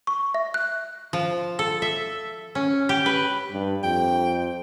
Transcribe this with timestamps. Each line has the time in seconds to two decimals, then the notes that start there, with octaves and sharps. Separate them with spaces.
0.07 C#6
0.34 E5
0.54 F#6
1.13 F3
1.59 A4
1.82 E5
2.55 C#4
2.89 G4
3.06 B4
3.52 G2
3.83 F2 G5